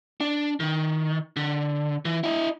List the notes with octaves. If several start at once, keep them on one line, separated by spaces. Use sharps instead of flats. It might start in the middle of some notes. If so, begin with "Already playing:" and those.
D4
D#3
D3
E3
E4 D#5